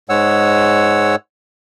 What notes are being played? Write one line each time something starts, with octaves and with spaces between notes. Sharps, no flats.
G#2 G#3 C#5 F#5 E6